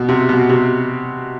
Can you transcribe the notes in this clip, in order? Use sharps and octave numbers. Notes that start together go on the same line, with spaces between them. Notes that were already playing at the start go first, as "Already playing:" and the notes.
Already playing: B2
C3
B2
C3